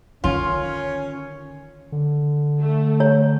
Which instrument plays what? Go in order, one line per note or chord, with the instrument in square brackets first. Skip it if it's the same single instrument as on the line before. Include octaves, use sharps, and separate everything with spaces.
[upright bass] D3 D#3 [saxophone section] C#4 [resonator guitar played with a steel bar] F4
[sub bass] D3
[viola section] A3
[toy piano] C#5